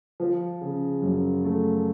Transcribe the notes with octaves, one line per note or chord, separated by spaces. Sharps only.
F3
C#3
F#2
A3